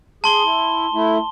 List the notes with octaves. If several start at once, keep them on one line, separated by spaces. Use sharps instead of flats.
G#4 A5 C6 G7
E4
A3 E4